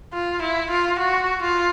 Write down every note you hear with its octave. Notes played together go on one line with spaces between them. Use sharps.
F4
E4
F4
F#4
F4